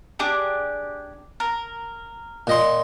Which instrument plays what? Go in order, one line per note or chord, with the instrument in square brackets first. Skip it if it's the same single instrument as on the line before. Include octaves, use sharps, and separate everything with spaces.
[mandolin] D4 G4 G#4
A#4
[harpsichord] A#2 D#5 C6